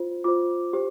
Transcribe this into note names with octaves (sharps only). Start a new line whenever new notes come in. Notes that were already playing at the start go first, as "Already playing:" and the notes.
Already playing: F4 C5
F4 C5 D6
G4 C5